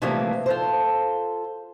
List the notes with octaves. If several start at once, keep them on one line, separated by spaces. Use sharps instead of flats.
C3 E3 F3 G3 A3 A#3
F4 A4 C5